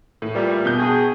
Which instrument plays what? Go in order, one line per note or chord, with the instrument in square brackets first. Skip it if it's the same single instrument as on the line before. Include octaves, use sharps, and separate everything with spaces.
[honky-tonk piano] A2
[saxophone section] A#2 E3 G3
[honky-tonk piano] B2 G6
[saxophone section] G2 F#4 G#4